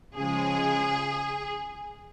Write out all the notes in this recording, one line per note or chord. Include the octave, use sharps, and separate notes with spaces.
C#3 F3 G#3 G#4